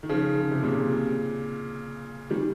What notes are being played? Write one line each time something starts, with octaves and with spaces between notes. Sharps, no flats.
D#3
C#3 F3
C#3
C3
A#2 C#3
D#3 G3